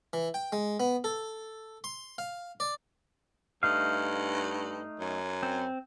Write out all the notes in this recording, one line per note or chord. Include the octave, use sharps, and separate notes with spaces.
E3
G5
G#3
B3
A4
C6
F5
D5
G2 A3 D#4 F5
F#2
C4